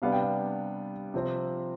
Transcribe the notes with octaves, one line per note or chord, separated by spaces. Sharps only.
C3 G3 B3 D4 F5
G5
F5
C3 F3 C4